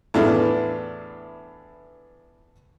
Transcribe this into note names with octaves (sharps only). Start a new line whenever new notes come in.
E2 A2 B3 D4 F4